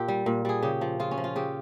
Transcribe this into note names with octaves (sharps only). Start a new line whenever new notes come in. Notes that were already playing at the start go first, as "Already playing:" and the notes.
Already playing: A#2 G4
G3
A#2
G3 G#4
C#3 G4
F3
C#3 F4
C#4
F3
F4
C#3 G4